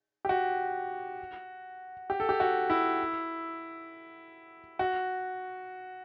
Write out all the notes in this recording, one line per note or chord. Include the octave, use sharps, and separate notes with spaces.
G4
F#4
G4
A4
G4
F#4
E4
F#4